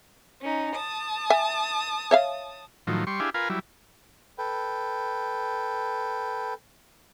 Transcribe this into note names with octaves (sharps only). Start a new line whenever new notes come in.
C#4 D#4
A5 D#6
E5 G#5
C#5 E5 F5
A2 D#3 F3 F#3
G3 C6 C#6
D4 E4 G4 G#4 F5
F4 A#4 B4 F5 G#5
F#3 G3 E4
A4 B4 G5